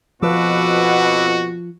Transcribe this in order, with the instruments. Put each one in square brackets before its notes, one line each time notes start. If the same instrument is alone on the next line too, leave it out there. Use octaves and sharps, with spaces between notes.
[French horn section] F2 B2 [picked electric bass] F3 [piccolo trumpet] F#4 [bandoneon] B4 D6 E6